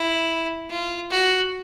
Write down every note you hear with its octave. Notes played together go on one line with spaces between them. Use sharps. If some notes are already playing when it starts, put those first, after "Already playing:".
Already playing: E4
F4
F#4